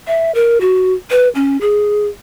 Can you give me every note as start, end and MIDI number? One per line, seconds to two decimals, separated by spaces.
0.07 0.34 76
0.35 0.58 70
0.61 0.93 66
1.11 1.28 71
1.35 1.57 61
1.61 2.07 68